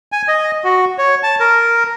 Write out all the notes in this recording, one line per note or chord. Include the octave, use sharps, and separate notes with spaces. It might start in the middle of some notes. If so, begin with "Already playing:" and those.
G#5
D#5
F#4
C#5
A5
A#4